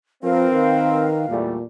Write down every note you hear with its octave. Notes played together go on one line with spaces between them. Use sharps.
F3 C4 A#4 B4 F5
D#3
E2 A#2 G3 A3